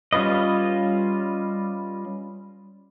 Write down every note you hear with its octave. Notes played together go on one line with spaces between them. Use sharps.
G3 C#4 F4 B4 D#5